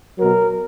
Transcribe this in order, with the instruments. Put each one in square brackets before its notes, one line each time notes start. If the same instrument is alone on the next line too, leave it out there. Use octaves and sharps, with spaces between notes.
[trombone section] B2 F#3 A#4